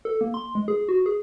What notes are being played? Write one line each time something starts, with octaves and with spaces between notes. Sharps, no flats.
A4
A#3
C6
G#3
G#4
F#4
G#4